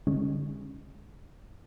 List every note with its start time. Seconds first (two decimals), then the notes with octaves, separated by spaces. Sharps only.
0.07 D3 G#3 C#4